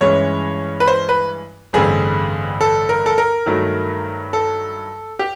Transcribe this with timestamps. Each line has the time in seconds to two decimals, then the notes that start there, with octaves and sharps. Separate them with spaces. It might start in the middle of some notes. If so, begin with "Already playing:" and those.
0.01 G2 E3 G#3 C#4 C#5
0.80 B4
0.87 C5
1.09 B4
1.73 A1 G2 D3 G3 C4 G#4
2.61 A4
2.89 A#4
3.06 A4
3.18 A#4
3.46 G2 D#3 F#3 A3
4.33 A4
5.19 G4